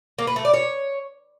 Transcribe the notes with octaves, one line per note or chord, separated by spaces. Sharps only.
A#3
B4
A3
D5
C#5